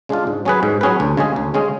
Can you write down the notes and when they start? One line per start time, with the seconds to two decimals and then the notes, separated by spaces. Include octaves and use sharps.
0.09 C#3 G#3 D4 F4
0.27 G#2
0.45 F#3 C#4 G#4 B4
0.63 G#2
0.81 F#3 C#4 G#4 B4
1.00 D2
1.17 C#3 G#3 C#4 G#4
1.36 D2
1.54 C#3 G#3 C#4 G#4